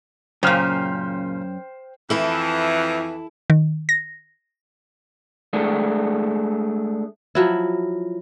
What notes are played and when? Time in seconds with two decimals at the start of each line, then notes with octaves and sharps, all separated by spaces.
0.43 F#2 A#2 C#3 C5 G5 F6
2.10 F2 E3 E4 A4
3.50 D#3
3.89 A#6
5.53 G#3 A3 D4
7.35 F3 F#3 E4